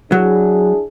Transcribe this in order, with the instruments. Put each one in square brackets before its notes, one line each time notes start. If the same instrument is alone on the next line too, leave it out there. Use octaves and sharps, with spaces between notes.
[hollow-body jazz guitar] F#3 [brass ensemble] D4 E4 G#4